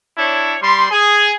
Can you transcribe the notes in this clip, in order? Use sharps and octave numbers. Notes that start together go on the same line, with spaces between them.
D4 E4 C#5
G3 C6
G#4